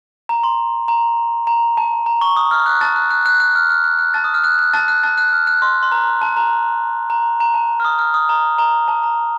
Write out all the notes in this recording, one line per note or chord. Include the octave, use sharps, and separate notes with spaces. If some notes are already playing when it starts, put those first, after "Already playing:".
A#5
C6
A#5
A#5
A5
A#5
C#6
D#6
F6
F#6
A5 A6
F#6
F#6
F#6
F#6
F6
F6
F#6
F#6
A5 A6
D#6
F6
F#6
F#6
A5 A6
F#6
A5 A6
F#6
F6
F#6
C6
C6
A#5
A5
A#5
A#5
A#5
A5
F6
D#6
F6
D#6
A#5
A#5
A5
A#5